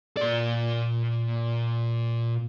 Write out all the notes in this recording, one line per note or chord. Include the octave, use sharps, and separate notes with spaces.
A#2 D5